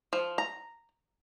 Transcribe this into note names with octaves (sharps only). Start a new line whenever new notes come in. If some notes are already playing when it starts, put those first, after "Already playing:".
F3
A#5